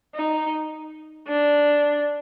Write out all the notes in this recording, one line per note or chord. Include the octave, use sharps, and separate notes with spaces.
D#4
D4